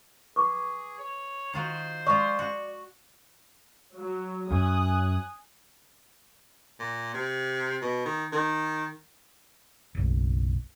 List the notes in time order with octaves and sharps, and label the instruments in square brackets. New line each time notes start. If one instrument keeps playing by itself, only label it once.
[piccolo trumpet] G#4 [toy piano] B4 C#6 D6
[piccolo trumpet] C#5
[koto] D#3 F4 F#4 [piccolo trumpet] C5
[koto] G#3 F4 [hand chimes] D5 [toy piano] C#6
[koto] F#4
[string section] F#3
[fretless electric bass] F#2 [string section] G#5 D#6 F#6
[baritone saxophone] A#2
C3
B2
D#3
D#3
[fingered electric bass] F#1 B1